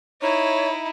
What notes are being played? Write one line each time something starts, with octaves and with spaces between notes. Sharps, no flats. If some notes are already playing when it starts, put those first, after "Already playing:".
D#4 E4 C#5